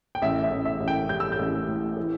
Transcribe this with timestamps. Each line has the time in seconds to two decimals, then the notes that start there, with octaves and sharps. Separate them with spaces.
0.15 G5
0.22 A1 E5
0.44 E5
0.51 A1
0.65 E5
0.80 A1
0.88 G5
1.09 G3 G6
1.20 E6
1.32 G6
1.39 A1
1.67 A2
1.97 E3